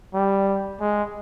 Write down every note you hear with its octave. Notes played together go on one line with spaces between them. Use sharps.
G3
G#3